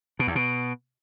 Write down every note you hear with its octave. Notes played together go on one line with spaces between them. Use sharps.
B2
E2
B2